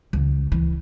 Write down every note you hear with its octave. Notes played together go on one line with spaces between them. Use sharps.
C#2
E3